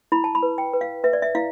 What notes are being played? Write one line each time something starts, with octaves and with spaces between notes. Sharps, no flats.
E4 B5
A5
B5
B4
G5
B4
F5
B4 E5
D5
E5
E4 F5